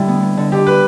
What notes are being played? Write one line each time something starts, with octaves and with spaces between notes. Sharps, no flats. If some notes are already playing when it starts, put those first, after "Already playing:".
Already playing: D3 G3 E4
B3
B3
D3
D3 G4
B4